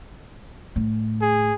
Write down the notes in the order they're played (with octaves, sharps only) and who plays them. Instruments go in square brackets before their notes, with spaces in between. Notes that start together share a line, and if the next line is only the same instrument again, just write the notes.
[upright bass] A2
[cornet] G#4